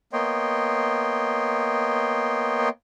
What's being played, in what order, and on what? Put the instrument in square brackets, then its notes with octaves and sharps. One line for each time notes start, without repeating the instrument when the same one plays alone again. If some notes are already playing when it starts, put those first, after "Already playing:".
[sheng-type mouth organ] A#3 B3 C#5 D#5 G5 C6